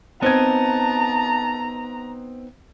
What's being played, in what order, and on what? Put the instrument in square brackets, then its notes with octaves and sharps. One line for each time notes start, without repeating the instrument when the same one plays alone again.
[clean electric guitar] B3 D#4 [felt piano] C4 G#6 [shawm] A5 [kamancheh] A#5